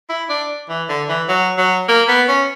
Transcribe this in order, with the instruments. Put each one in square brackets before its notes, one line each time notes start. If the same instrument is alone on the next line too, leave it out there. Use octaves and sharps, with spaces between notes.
[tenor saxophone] E4
D4
E3
D3
E3
F#3
F#3
A#3
B3
C#4